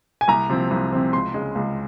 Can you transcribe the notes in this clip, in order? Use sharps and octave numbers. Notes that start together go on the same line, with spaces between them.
G#5
C2 A#5
C3 F3 C4
C2
C3 F3 C4
C#2 C6
C#3 G#3
C#2